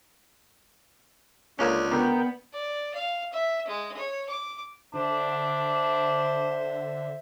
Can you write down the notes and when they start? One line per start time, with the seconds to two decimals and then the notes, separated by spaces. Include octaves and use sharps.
1.59 C#2 D3 A#3 C#4
1.91 D3 B3 A#4 G5
2.53 D5
2.94 F5
3.33 E5
3.67 G#3
3.97 C#5
4.29 D6
4.94 D3 D4 C5 E5